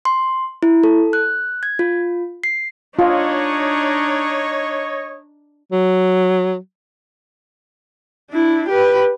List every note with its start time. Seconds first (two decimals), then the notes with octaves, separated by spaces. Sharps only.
0.05 C6
0.63 E4
0.84 A4
1.13 F#6
1.63 G#6
1.79 F4
2.44 C7
2.99 D4 D#4 F4 C#5 D#5
5.72 F#3
8.31 D4 E4
8.68 G4 B4